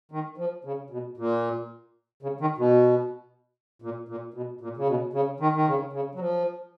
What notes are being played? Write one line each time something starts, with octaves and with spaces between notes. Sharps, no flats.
D#3
F3
C#3
B2
A#2
C#3
D#3
B2
A#2
A#2
B2
A#2
C#3
B2
C#3
D#3
D#3
C#3
C#3
F#3
F3